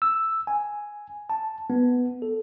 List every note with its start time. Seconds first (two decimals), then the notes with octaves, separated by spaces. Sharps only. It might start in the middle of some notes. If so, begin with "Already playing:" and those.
0.02 E6
0.47 G#5
1.30 A5
1.70 B3
2.22 A4